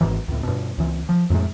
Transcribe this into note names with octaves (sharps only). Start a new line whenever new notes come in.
G#1 G#2 E3
C#2 A2
G2 B2
C#2 E3
F3
F2 A2 C3 G#3